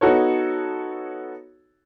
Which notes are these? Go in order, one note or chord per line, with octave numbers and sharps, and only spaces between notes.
B3 D#4 F#4 A4 C#5